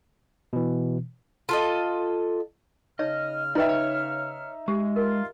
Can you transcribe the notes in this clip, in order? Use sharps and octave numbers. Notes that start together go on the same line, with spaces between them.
B2 E3
F4 A4 D#5
C#3 D#4 C#5 D#5 F6
D#4 F4 B4 D5 E5 G5
C#5
G#3 G4
F4 A#4